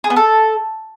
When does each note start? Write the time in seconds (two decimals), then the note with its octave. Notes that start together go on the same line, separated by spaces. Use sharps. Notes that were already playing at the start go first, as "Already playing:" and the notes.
0.04 G#4
0.10 B3
0.16 A4